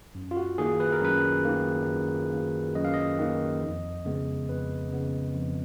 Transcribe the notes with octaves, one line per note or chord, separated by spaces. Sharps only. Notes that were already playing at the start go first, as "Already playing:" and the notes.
F#2
F4
F#4
D#3 A#3 G#4
B4
A#4
F#2 B4
D#3 A#3
F#2
D#3 A#3
F#2 D#5
F5
D#5
D#3 A#3
F2
C#3 G#3 B3
F2 B4
C#3 G#3 B3
F2